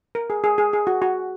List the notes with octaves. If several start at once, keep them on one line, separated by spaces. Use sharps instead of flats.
A#4
G#4
G#4
G#4
G#4
F#4
F#4